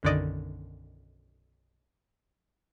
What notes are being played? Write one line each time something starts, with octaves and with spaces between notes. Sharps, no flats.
B1 F#2 D3 D#3 D5 D#5